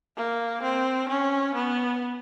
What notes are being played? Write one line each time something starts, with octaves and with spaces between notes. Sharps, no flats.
A#3
C4
C#4
B3